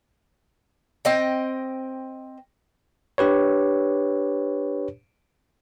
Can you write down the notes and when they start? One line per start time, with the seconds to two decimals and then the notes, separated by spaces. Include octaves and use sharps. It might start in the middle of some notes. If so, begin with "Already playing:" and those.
1.05 C4 D#5 G5
3.18 D4 G4 B4 C#5